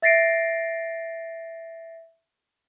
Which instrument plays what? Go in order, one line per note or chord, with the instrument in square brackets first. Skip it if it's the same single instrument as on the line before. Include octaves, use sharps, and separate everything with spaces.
[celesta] E5 A6 A#6 C7 D7